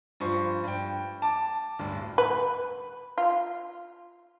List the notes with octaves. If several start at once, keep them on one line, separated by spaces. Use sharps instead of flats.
G2 F3 C5 C#6
G2 G5
A5 D6
D1 G2
B4
F4